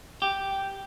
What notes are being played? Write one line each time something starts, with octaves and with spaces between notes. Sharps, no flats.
G4